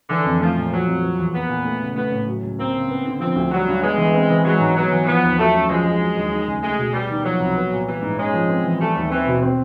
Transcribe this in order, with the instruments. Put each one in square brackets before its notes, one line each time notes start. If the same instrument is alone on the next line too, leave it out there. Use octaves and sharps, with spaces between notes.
[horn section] D3 [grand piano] E3
[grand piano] F2
[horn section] F3 [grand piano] A3
[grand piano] A#2
[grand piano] F3 [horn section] F#3
[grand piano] F2
F3
E2
[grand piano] A#3 [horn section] B3
[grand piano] A#2
A3
C#3
[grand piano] A3 [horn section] B3
[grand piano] A2
F#3
C#2
[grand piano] A#3 [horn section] C4
[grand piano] C#3
B3
D3
[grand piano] F3 [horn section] C4
[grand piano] D2
[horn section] F#3 [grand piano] G3
[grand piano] G2
[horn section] G#3 [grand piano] B3
[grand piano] E3
C4
E3
[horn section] F#3 [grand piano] G#3
[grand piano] G#2
[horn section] F#3 [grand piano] B3
[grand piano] E3
[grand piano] F3 [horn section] B3
[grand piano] D#2
[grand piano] F#3 [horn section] A3
[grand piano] F#2
[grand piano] F3 [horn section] G#3
[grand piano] G2
F#3
D#2
D#3
C#2
[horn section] G#3 [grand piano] A3
[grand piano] B2
[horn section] G3 [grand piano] B3
[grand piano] D#3
[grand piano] F3 [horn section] F#3
[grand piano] C2
B3
A#2
[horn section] E3 [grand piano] G3
[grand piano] G#2
[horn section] G#3 [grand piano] C#4
[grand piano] F3
C4
E3
[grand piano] G3 [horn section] A3
[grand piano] D#2
[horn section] E3 [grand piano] C4
[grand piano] B2
C4